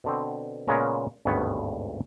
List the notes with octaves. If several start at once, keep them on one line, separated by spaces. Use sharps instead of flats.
B2 D3 C4
A#2 C#3 G#3 B3 C#4 A#4
G#1 D2 G2 B2 B3 C#5